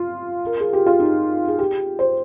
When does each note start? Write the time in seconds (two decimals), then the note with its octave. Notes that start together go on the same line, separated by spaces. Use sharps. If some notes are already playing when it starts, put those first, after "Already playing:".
Already playing: F4
0.46 A#4
0.60 G#4
0.73 G4
0.86 F4
1.00 D#4
1.48 G#4
1.59 G4
1.99 C5